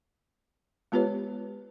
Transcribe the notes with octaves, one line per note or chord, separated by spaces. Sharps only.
G#3 B3 F4 G4 B4 C#5